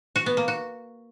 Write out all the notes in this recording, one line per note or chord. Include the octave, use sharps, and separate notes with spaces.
F#4
B3
A#3
F#4